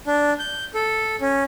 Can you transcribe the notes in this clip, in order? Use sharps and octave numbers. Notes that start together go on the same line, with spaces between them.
D4
G6
A4
C#4